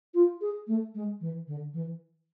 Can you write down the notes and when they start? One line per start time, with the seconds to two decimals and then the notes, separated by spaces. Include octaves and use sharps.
0.14 F4
0.41 G#4
0.67 A3
0.95 G#3
1.21 E3
1.47 D3
1.74 E3